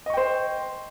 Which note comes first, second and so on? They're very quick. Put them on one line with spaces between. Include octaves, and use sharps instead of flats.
D#5 C#6 G5 C5